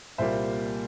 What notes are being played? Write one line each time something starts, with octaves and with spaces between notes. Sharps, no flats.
C2 A#2 G3 A#3 C5 E5